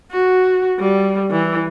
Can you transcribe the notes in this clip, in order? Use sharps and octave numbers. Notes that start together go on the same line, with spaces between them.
F#4
G3
E3